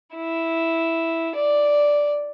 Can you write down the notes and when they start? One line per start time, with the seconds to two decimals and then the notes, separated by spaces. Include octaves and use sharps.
0.16 E4
1.36 D5